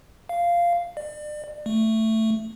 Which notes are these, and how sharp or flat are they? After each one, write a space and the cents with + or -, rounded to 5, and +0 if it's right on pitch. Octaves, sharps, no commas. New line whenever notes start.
F5 -10
D5 +35
A3 +10